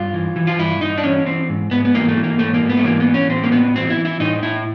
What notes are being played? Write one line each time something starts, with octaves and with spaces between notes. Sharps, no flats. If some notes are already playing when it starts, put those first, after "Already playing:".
Already playing: G2 F4
E3
E3
F4
G2 E4
G2 D#4
D4
E3 C#4
E3 C4
G#2
G#2 B3
B3
E3 A#3
A3
E3
A#3
G#2 A3
A#3
G#2
B3
A3
E3 A#3
B3
E3
C#4
A2 C4
A#3
A2 B3
E3 C4
E4
E3
E4
A2 D#4
A2 E4